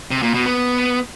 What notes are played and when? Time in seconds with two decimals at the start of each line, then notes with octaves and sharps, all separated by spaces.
0.11 C3
0.23 A#2
0.34 B2
0.46 B3